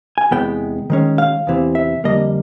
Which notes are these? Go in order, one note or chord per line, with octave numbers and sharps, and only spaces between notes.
G#5
E2 C3 E3 G#3 B3 G5
D#3 G#3 C#4
F5
E2 C3 E3
E5
F2 D3 G3 A#3 D#5